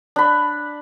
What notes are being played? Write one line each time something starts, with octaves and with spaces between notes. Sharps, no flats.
D4 B5